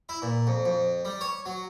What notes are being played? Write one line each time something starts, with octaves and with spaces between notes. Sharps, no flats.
E4
A#2
F2
F2
G3
C#5
F#3